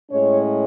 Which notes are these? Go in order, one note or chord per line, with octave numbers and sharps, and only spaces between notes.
A2 G#3 C#4 C#5